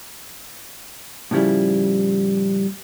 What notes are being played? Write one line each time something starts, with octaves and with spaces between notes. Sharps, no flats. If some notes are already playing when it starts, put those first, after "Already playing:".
A2 C#3 F3 G3 E4